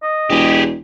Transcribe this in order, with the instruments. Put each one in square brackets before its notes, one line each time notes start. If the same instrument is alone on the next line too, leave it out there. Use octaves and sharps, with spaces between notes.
[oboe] D#5
[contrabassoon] E1 [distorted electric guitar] G4 G#4